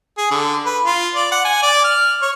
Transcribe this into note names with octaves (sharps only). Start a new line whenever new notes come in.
G#4
D3
B4
F4
D5
F#5
G#5
D5
F6
C#5